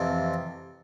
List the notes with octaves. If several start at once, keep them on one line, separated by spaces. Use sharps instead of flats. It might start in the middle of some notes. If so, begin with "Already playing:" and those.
Already playing: F2 C3 E3